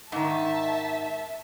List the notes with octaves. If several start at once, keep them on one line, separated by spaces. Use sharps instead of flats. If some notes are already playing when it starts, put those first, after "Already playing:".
G#2 D#3 E5 A5